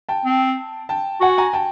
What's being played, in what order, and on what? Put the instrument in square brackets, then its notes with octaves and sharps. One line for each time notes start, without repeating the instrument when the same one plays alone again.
[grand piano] G5 A5
[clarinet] C4
[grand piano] G5 A5
[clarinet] F#4 [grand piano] F#5 G#5
[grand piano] G#5 A#5
G5 A5